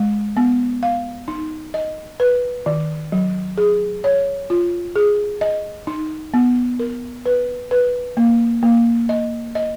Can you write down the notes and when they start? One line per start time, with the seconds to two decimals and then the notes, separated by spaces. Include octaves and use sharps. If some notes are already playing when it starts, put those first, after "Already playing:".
Already playing: G#3
0.37 B3
0.83 F5
1.28 D#4
1.74 D#5
2.20 B4
2.66 D#3
3.12 F#3
3.58 G#4
4.04 C#5
4.50 F4
4.96 G#4
5.41 D#5
5.87 D#4
6.34 B3
6.80 A#4
7.26 B4
7.71 B4
8.17 A#3
8.63 A#3
9.09 D#5
9.55 D#5